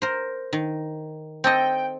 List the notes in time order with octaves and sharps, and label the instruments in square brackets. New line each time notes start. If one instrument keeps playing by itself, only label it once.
[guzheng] A#4 C5
D#3
[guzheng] C4 A4 D#5 [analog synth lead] G5